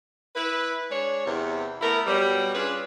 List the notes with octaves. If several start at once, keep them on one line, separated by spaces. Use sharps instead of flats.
E4 B4
G#3 D4 C#5
E2 C3
A3 B3 E4 A#4
B2 F#3 G3
C#4 D4 F4 G#4 B4